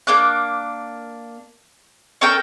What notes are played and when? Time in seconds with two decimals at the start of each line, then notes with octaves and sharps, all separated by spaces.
0.07 A#3 D4 D6 F#6
2.21 C#4 A4 A#4 G5